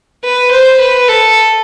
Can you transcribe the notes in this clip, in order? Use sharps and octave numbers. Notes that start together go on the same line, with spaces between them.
B4
C5
B4
A4